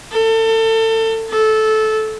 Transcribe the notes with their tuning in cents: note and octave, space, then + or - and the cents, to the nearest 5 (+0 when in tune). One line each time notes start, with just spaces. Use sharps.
A4 +30
A4 -15